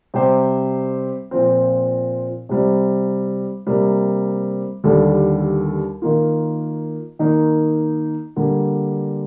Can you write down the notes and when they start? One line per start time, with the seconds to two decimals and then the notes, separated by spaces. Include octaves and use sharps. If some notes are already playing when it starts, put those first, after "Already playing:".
0.14 C3 G3 C4 G4 C5
1.31 A#2 F3 C4
2.49 C3 G3 C4
3.67 C3 G3 A#3
4.84 D#2 D3 G3 D4 A4
6.02 D#3 A#3 F4
7.19 D#3 A#3 D#4
8.36 D3 G3 A#3